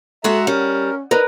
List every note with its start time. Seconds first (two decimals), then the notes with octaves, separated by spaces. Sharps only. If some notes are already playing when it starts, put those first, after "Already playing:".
0.24 G#3 F#4 A4 E5 F#5 A#5
0.47 G3 C#4 A#4
1.11 D#4 A#4 B4